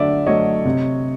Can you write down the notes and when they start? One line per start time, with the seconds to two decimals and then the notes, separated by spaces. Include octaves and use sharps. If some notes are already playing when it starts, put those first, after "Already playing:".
Already playing: D3 F#3 A3 D5 E5
0.27 F#3 A3 C#5 D#5
0.65 C3